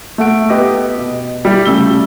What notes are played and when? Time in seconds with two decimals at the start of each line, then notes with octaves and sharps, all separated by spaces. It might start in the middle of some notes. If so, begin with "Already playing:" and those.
0.18 A3 F#5 D7
0.49 B3 G4 D#5
0.98 B2
1.45 G3 E4
1.65 C#3 G3 A3 E6 G7